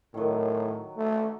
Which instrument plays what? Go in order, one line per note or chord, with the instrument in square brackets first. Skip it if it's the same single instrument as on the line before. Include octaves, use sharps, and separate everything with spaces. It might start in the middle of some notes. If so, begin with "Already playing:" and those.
[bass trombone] A2 [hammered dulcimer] D#3 F#3
[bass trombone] A3